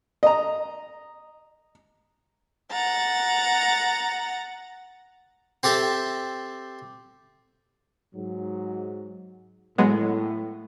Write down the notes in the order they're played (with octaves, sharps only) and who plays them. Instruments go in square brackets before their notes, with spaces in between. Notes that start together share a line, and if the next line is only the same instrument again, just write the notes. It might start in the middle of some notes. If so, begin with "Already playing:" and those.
[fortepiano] D#5 A#5
[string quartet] F#5 A#5 A6
[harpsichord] C4 G4 A4 E5
[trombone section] G#2 F#3
[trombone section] A2 [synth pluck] F#3 G#3 B3